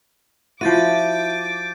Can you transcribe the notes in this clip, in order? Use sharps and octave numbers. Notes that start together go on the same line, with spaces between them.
F3 E4 F#4 D6 G6 A6 D#7